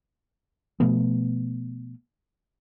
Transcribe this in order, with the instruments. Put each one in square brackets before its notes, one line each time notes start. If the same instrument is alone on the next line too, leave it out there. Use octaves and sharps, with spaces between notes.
[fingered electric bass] B2 F3 A3 B3